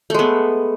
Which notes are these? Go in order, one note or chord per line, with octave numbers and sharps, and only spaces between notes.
G#3 A3 B3